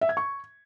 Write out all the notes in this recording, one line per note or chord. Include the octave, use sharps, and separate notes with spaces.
E5
G#6
C#6